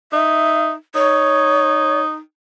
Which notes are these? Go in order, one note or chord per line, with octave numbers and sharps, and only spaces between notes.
D#4 E5
D#4 C#5